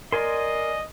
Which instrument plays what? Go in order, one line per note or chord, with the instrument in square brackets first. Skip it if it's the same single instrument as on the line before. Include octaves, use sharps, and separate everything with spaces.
[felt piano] A#4 [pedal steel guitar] D5 G#5 C6 [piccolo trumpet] D#5